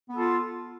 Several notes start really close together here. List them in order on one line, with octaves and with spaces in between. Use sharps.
B3 A4 F4